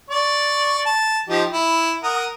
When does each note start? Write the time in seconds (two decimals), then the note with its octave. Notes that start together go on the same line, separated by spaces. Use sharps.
0.10 D5 C#6
0.86 A5
1.29 F3 D#4 G4
1.52 E4
2.03 A#4 F#5 D#6